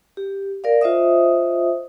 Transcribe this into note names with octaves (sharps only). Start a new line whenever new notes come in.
G4
A#4 D5 F5
F4 C5 D#5 E5 D#6